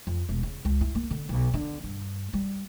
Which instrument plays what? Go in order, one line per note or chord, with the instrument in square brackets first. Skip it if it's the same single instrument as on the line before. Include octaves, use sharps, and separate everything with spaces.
[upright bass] F2
E1
C#3
C#2
E4
A#3
D3
B1
D3
G2
G3